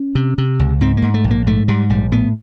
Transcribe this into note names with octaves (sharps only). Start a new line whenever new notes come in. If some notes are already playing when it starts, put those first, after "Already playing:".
Already playing: C#4
C3
C3
C#2
G#2 C4
A#3
G#2
A3
A#1
A#3
G#2 A3
G#2 G3
A#1 G3
A2 B3